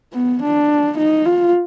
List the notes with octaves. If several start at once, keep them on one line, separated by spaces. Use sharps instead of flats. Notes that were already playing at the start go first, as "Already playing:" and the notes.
B3
D4
D#4
F4